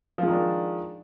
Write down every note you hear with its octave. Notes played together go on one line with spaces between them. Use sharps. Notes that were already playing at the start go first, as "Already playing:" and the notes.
D#3 F3 G#3 D4